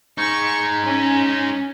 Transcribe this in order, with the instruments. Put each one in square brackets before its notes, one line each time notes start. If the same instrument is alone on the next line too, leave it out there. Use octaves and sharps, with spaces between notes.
[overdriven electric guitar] G#3 D#4 [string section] C#6
[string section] C#4